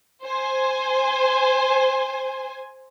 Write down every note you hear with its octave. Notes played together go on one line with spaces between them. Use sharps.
C5 G#5